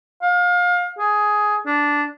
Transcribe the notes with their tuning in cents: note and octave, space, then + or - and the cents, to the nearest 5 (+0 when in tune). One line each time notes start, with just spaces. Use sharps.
F5 +30
G#4 +10
D4 -10